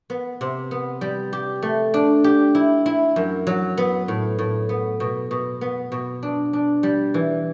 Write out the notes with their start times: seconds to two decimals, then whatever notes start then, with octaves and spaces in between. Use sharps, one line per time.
0.10 B3
0.41 C3
0.71 B3
1.01 G3
1.33 G4
1.63 A3
1.94 D4
2.24 G4
2.55 E4
2.86 E4
3.16 F#2
3.47 F#3
3.77 B3
4.08 A2
4.39 A2
4.69 B3
5.00 B2
5.31 B2
5.61 B3
5.92 B2
6.23 D4
6.53 D4
6.83 G3
7.14 E3